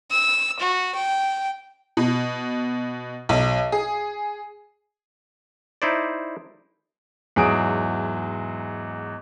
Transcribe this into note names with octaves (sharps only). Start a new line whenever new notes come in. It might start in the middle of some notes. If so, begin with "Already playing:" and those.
E6
F#4
G5
B2
B1
G#4
D#4 E4 C5 D5
E2 G#2 F#3 G#4 D#6 D7